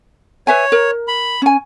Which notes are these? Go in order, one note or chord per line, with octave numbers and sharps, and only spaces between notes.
B4 C#5 E5 G#5
A#4
B5
C#4 G#5